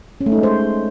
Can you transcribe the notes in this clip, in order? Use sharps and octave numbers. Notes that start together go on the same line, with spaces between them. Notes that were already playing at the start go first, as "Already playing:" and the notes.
C#4
A3
D#4
G#3
C5